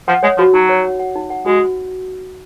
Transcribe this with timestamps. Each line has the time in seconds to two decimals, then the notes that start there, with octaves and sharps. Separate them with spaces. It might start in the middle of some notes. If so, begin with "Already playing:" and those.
0.08 F3 F#5
0.23 G#3 C#5
0.38 F3 F#4
0.54 F#3 D#4
0.69 C#5
0.84 F#5
0.99 F#5
1.15 D#4
1.30 F#5
1.46 G#3 F#4